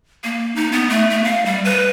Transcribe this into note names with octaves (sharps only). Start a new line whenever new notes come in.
A#3
D#4
B3
A3
A3
F5
G3
B4